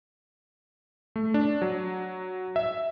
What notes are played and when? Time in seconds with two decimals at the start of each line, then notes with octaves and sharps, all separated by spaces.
1.16 A3
1.34 D4
1.62 F#3
2.56 E5